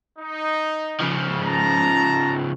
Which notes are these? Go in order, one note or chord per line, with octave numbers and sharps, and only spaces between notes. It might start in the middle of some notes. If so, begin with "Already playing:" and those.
D#4
C#3 F3
A5 A#5